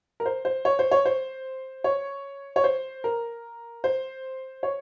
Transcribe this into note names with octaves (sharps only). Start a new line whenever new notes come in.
A#4
C5
C5
C#5
C5
C#5
C5
C#5
C#5
C5
A#4
C5
C#5